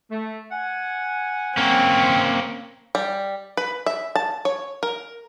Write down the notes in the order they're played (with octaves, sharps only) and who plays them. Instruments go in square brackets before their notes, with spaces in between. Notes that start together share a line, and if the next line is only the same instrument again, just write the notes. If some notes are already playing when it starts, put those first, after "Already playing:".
[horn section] A3
F#5 G#5
[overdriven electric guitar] A#3 C#4 [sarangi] C4
[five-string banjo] G3
B4
E5
A5
C#5
A#4